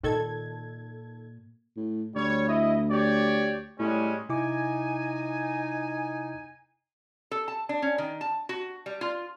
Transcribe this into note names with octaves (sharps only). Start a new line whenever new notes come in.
A#2 D#3 A4 G#6
A2
D2 G3 C#5
E4 D#5
G4 C#5 D5
A2 G3 G#3 C#4
C3 D#4 E4 G#5 D6
A4
A5
D4
C#4
D#3
A5
F#4
G3
F4